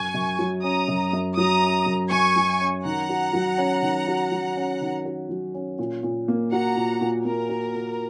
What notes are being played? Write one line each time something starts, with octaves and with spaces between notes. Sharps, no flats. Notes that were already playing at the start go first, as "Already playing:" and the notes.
Already playing: F#2 G#5 C#6
F#2
F#3
C#4 A#5 D#6
F#2
F#2
F#3 A#5 D#6
C#4
F#2
F#2 G#5 C#6
F#3
C#4
D#3 F#5 A#5
F#4
F#3
C#4
D#3
F#4
F#3
C#4
D#3
F#4
F#3
C#4
A#2
A#2
A#3
F#4 F#5 A#5
A#2
A#2
A#3 A#4
F#4
A#2